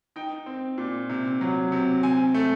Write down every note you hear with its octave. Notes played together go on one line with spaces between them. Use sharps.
D#4 G5
C4
A#2
C3
F#3
C3
C4 G#5
A3